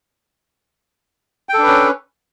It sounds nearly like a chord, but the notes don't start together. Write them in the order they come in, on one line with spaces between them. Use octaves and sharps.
G5 A4 D4 B4 C#4